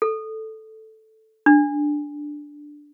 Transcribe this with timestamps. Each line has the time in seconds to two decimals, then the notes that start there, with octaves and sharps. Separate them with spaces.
0.02 A4
1.46 D4